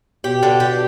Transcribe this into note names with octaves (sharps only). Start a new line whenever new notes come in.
B2 G4
D3
G4